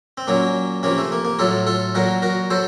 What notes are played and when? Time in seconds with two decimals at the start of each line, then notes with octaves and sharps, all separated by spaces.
0.18 C4
0.27 A#2 F#3 A#3 C#4
0.83 C3 F3 A#3 C#4
0.98 A3
1.12 A#3
1.25 A#3
1.39 A2 F#3 F4 A4
1.67 F4 A4
1.94 A#2 F#3 F#4 A#4
2.22 F#4 A#4
2.50 F#3 A4 C5